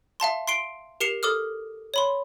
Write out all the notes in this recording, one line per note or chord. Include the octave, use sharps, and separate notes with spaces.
E5 F5 A5 C6
C6 C7 D7 G7
G4 A#4 C7 C#7 E7 F7
A4 D6 D#6 F6
C#5 B5 C6